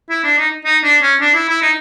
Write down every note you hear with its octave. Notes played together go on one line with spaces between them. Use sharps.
E4
D4
D#4
D#4
D4
C#4
D4
E4
E4
D#4